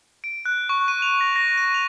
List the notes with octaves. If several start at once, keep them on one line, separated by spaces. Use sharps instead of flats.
D7
F#6
C#6
D#7
F7
A#6
A#6
D#7
F7